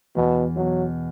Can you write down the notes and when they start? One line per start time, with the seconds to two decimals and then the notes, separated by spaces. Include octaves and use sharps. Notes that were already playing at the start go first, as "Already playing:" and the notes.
0.16 E2 B2
0.56 B2 F#3